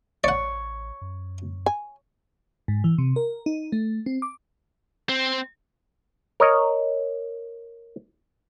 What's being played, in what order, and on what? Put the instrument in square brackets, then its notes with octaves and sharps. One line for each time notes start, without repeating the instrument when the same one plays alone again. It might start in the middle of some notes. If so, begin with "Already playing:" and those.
[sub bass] A1 [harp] C#5 [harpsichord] D5 F#5
[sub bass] F#2
[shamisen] G#5
[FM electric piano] G#2
E3
C3
A#4
D#4
A3
C4
D6
[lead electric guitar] C4
[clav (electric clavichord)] A#4 C#5 D#5